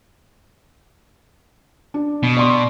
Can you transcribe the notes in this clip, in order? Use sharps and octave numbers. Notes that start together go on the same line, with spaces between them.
D4
B2
D5 C6